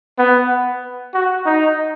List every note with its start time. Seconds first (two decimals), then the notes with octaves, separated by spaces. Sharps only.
0.19 B3
1.14 F#4
1.46 D#4